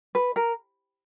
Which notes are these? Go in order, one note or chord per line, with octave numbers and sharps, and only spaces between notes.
B4
A#4